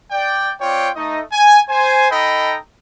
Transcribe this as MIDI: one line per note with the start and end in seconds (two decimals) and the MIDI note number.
0.11 0.51 74
0.11 0.51 79
0.60 0.89 60
0.60 0.89 65
0.60 0.89 73
0.60 0.89 74
0.60 0.89 79
0.96 1.21 57
0.96 1.21 63
0.96 1.21 75
1.33 1.59 80
1.69 2.09 72
1.69 2.09 80
2.10 2.56 63
2.10 2.56 69
2.10 2.56 75
2.10 2.56 79
2.10 2.56 82
2.10 2.56 83